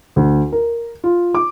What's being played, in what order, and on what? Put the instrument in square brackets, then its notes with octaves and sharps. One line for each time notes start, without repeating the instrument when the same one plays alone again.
[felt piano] D2
A#4
F4
D6